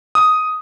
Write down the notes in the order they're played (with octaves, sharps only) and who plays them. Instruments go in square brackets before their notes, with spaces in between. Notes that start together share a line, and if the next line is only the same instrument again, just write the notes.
[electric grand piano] D#6